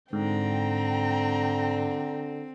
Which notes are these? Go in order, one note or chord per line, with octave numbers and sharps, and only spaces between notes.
G#2 D3 C4 G5 A#5